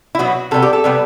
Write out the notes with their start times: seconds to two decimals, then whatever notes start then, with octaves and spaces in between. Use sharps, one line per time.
0.15 E4
0.19 B2 F#3 B3 F#4
0.51 C3 G3 B3 A4
0.62 G4
0.73 A4
0.84 C3 G3 B3